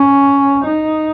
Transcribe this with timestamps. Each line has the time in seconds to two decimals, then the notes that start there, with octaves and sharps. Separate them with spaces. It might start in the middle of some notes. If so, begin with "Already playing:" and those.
Already playing: C#4
0.64 D#4